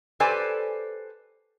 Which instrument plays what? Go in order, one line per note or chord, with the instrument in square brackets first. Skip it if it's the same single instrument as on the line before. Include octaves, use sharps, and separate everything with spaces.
[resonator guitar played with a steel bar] G4 A4 B4 C5 D5 G#5